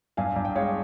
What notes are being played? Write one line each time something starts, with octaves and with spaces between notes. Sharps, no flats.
G2 F5 G#5
G2
G5
G#3 C#5 F5